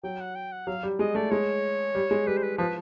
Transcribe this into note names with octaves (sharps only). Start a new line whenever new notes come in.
F#3 G5
F#5
G5
F#5
F#3 F5
G3
G#3 D#5
A3 D5
G#3 C#5
G3
G#3
G3 B4
C5
B4
F3 B4